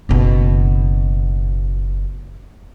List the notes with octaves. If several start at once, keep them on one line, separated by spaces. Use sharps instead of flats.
F#1 B2